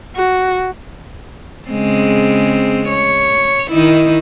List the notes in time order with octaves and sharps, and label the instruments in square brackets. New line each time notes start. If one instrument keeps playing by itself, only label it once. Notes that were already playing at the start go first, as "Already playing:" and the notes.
[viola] F#4
[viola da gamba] C#3 G#3 C4
C#5
D#3 D#4 E4